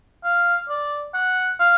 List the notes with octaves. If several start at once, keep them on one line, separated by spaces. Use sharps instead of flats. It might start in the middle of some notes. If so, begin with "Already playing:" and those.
F5
D5
F#5
F5